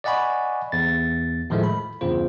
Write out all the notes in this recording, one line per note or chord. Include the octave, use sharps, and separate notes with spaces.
D5 D#5 F#5 G#5 B5 C#6
E2 A6
A2 D#3 F3 G#3 A3
B5
E2 G2 C#3 F4 C5